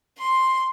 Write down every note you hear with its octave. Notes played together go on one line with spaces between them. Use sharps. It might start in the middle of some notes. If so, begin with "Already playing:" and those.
C6